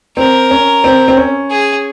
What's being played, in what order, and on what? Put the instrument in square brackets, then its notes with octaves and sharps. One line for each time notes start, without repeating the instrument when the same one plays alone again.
[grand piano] C4 [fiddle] A#4
[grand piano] C#4
C4
C4
C#4
[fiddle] G#4